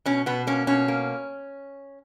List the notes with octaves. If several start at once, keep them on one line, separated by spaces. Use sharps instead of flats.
B2 C#4
B2 B3
A#3 C#4
B2 C#4
A#3